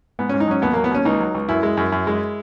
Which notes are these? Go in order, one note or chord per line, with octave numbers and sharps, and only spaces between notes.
G#2 B3
C#4
G#2
D#4
F#3 C#4
D#2 B3
A#3
F#3
B3
D#2 C#4
C#2 D#4
F#3
C#2
F#2 E4
G#3
F#2
F#2
G#3